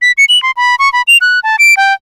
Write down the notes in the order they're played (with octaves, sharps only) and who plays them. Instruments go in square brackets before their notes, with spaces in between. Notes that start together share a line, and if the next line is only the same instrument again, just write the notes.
[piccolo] B6
C#7
F#7
C6
B5
C#6
B5
F7
F#6
A5
D7
G5